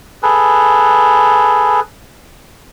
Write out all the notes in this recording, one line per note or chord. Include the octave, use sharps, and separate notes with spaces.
G#4 A4 B4